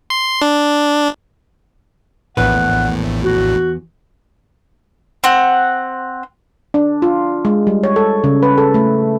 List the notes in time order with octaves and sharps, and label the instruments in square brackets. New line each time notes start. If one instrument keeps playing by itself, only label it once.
[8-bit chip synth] C6
D4
[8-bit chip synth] A#1 A2 [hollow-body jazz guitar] E2 B4 [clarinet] F#5
[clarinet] F#4
[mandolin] C4 F#5
[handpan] D4
F4
G#3
G3
C#5
A4
C#3
B4
A4
A3